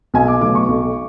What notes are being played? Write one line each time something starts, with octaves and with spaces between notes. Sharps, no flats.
B1 G#5
D6
B2 F#3 A3 D6
C#6
B1